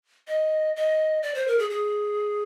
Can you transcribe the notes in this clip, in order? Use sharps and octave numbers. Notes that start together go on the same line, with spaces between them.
D#5
D#5
D5
C5
A#4
G#4
G#4